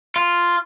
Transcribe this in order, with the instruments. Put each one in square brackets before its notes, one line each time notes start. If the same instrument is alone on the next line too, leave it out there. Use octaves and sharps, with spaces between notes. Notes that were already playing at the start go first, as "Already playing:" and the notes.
[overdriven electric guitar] F4